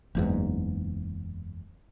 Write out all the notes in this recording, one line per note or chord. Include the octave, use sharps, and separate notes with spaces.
F#1 E2 G#2